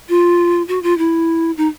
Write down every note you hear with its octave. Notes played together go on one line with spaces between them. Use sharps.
F4
F#4
F4
E4
D#4